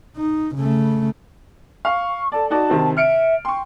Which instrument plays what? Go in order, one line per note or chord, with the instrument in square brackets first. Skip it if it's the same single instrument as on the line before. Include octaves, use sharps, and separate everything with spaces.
[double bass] D#4
C#3 A3
[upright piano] F5 [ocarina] C#6
[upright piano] A4 D5 [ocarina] A5
[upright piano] D#4 F#4 D5 [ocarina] A5
[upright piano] C3 D#3 C4
[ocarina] E5 [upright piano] F6 C#7 D7
[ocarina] G5 [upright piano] C6 C#6